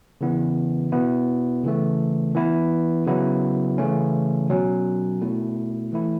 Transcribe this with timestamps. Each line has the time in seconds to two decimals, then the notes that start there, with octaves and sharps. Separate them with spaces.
0.21 C#3 E3 B3 E4
0.92 B2 B3 E4
1.64 C#3 E3 A3
2.35 E3 B3 E4
3.07 C#3 F#3 B3 E4
3.78 C#3 E3 A3 C#4
4.50 B2 F#3 C#4
5.21 B2 A3 E4
5.92 E3 A3 E4